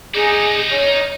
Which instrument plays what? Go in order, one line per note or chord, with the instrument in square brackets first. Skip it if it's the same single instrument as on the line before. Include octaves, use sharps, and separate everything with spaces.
[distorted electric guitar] D#4 D5 [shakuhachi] G#4
[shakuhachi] C#5